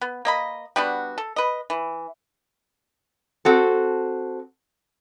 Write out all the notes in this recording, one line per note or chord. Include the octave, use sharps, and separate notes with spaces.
B3
A#3 D#5 B5
G3 B3 D4 F#4
A4
B4 D#5
E3
C4 F#4 A4